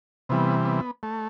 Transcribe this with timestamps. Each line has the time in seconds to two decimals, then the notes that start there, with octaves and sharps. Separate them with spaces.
0.29 C3 E3 G3 B3
0.65 B3
1.03 A3